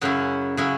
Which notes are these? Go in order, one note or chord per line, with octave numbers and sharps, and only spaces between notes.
F#2 C#3 F#3 C#4 E4
C#3 F#3 C#4 E4